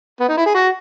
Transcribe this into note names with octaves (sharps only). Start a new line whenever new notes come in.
B3
D#4
E4
G#4
F#4